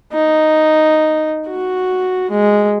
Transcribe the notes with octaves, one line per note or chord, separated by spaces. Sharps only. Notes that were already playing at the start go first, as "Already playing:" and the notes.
D#4
F#4
G#3